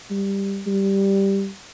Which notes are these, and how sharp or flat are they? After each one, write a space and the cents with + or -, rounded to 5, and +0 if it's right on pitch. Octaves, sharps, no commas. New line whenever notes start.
G3 +10
G3 +0